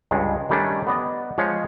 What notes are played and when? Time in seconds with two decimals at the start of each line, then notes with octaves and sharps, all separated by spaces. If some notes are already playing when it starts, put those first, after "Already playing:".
0.11 C#2 G2 G#3
0.49 D#3 G3 A3 C#4 D4
0.87 B3 D5 D#5
1.38 F3 G#3 G#4 C#5